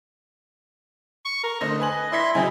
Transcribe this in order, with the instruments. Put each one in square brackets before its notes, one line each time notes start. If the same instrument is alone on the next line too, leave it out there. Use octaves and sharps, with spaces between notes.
[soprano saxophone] C#6
A#4
[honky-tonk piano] D3 A3 C5 [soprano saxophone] D#5
[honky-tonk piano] B4 G#5 F#7
[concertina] E4 E5 C6 [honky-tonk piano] D5 G#6 B6
[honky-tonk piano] C#3 F#3 G#5 [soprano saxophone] C4 [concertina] D#4 E4